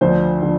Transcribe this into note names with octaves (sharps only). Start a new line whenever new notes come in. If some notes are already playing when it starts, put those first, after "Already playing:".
D2 D3 F3 C5
D3 F3